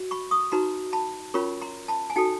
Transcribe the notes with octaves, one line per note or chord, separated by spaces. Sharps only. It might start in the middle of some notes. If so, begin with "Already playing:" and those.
Already playing: F#4
B5 C#6
C#6 D#6
D#4 F#4 B4 A#5 C6
A5 B5
C#4 F4 A#4 C#5 B5 C#6
A#5 C6
A5 B5
G#5
D#4 F#4 A4 G5 A5